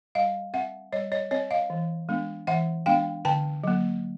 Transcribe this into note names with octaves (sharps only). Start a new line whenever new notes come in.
G3 D#5 F5
C4 E5 F#5
G3 C#5 D#5
C#5 D#5
C4 C#5 D#5
D#5 F5
E3
G#3 B3 D4
E3 E5 F#5
G#3 B3 D4 F5 G5
D3 G5 A5
F#3 A#3